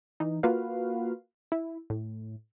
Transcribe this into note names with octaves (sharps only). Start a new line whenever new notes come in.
E3 D#4
A#3 F4 F#4 B4 F5
E4
A2